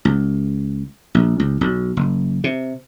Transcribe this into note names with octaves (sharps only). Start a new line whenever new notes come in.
C#2
A#1
C#2
B1
F#1
C3